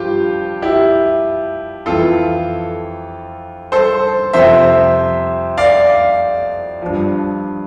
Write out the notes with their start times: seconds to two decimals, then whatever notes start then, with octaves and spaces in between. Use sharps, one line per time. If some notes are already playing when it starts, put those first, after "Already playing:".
Already playing: G2 F3 F4 G4
0.62 E4 G4
1.86 F2 E3 F4 A4
3.72 A4 C5
4.33 F2 C3 F3 C5 E5
5.57 D5 F5
6.82 G2 F3